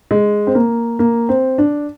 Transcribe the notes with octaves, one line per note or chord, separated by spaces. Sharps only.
G#3
C4
A#3
A#3
C4
D4